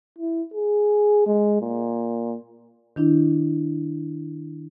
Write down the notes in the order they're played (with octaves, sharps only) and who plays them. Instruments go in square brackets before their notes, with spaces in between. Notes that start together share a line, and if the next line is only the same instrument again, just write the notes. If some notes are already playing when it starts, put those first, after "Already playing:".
[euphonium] E4
G#4
G#3
A#2
[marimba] D#3 D4 E4